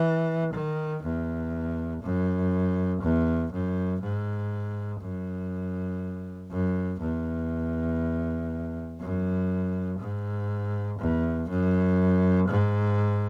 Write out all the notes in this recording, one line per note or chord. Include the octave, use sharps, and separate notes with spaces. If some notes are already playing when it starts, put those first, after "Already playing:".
Already playing: E3
D#3
E2
F#2
E2
F#2
G#2
F#2
F#2
E2
F#2
G#2
E2
F#2
G#2